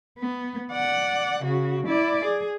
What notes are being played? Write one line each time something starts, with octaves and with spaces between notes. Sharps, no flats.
B3
D5 F#5
C#3 F#4
E4 D5
G#4